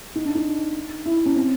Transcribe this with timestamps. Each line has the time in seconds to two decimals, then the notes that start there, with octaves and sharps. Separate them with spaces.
0.16 D#4
0.25 D4
0.35 D#4
1.06 E4
1.26 C#4
1.36 C4